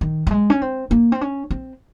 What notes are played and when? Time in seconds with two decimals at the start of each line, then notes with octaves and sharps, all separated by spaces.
0.01 D#3
0.27 G3
0.31 G#3
0.50 C#4
0.62 C4
0.91 A#3
1.12 C4
1.21 C#4
1.51 C4